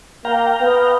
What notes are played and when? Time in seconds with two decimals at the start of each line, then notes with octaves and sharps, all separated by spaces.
0.25 A#3 F5 G5 A#5
0.61 B3